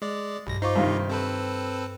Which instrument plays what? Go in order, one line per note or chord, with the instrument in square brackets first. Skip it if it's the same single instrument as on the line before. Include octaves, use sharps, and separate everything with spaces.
[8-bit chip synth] G#3 D5
[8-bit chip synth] B1 A#6 [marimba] G2
[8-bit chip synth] D#4 F4 [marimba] C5 C#6 D6
[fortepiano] G2 C3 D#3 [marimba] F5
[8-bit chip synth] C4 A4 B4